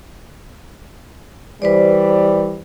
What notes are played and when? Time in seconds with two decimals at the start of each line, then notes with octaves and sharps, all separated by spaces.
1.62 E3 G3 B4 C5 D5